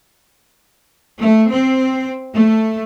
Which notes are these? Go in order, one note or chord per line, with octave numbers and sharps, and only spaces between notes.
A3
C4
A3